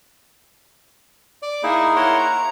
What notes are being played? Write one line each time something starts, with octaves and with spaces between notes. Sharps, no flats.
D5
A#3 D#4 E4 G#4
E4 A#4 C#5 F#5 C6
A#5